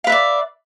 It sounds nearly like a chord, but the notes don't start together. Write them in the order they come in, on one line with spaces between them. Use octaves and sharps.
F5 B4 E5 D5